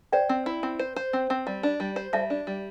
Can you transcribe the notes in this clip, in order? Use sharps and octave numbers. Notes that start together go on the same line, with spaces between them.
C5 D5 G5
C4
E4
C4
C5
C5
C4
C4
G3
D4
G3
C5
G3 E5 A5
D4
G3